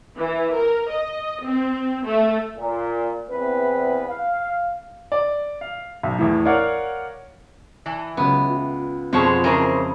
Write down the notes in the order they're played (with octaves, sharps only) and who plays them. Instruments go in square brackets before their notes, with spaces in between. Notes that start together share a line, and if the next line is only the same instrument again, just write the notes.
[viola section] E3
A#4
D#5
C4
A3
[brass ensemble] A#2
E2 C4 B4
F5
[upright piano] D5
F5
B1
E2 A2
A#4 C#5 D5 F5 F#5
[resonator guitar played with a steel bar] E3
[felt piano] C#2 [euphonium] F#3 [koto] B3
[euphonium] F4
[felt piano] F2 [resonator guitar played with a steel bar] B2 G#4 [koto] F3 G#3 C#5
[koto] C#3 [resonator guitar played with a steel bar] E3 A#4 C5